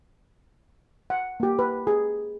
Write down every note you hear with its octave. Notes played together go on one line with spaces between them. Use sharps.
F#5
A#3 G4
B4
G#4